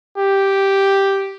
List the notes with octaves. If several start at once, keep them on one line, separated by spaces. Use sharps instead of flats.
G4